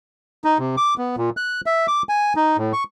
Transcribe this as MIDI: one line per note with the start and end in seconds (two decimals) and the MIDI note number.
0.44 0.58 63
0.59 0.76 48
0.77 0.94 86
0.98 1.16 59
1.17 1.30 46
1.37 1.61 90
1.66 1.87 76
1.88 2.02 86
2.09 2.33 80
2.36 2.57 63
2.58 2.73 45
2.73 2.84 85